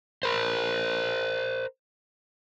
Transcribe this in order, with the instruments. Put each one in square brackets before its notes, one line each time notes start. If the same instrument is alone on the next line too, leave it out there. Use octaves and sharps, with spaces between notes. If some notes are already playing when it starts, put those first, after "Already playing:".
[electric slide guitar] A#4 C5